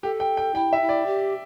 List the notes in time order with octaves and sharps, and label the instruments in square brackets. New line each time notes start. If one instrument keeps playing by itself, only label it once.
[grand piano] G4 [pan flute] A4
[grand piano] G5
G5
[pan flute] E4 [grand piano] G5
[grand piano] E5
[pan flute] E4
[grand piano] D5
[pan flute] G4